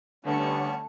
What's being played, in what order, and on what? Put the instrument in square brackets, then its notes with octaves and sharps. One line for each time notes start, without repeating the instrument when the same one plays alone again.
[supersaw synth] D3 C#7 [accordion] G3 B3 C#4 [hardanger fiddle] A3